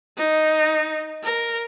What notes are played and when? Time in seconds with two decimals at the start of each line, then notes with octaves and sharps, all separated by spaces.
0.18 D#4
1.23 A#4